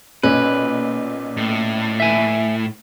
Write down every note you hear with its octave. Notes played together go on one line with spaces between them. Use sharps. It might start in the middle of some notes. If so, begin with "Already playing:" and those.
B1 A#2 C#4 B4
A2
E5 G#5